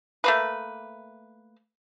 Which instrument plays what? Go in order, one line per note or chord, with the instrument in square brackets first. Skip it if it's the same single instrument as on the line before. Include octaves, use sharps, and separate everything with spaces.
[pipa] A3 A#3 B4